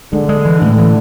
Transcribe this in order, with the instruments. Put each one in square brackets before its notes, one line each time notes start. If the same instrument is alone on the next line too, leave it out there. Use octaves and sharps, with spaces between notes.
[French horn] D3 [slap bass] G#3
[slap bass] G#3
E3
[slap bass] A2 [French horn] D3
[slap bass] E3